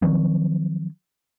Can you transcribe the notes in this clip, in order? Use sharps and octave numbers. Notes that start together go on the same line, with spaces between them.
D#3 F3 F#3 C4